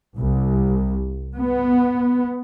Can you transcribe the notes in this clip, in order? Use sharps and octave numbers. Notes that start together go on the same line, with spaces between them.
C2
B3